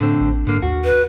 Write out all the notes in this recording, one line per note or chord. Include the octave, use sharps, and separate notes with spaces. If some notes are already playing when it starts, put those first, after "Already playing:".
A2 D3 A3 C4
A1
G#2 D3 A#3
D#2 F#4
B4